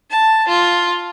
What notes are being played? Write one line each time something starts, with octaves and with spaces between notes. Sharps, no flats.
A5
F4